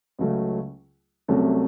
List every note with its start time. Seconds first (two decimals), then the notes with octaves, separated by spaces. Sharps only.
0.19 C#2 C#3 F#3 A3
1.28 C2 C3 F#3 A3 C#4